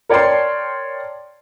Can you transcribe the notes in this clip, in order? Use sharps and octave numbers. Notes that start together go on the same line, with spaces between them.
A#4 C#5 D5 G5 A5 C6